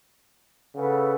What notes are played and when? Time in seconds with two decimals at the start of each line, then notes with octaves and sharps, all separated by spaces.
0.75 C#3 A4 B4 F#5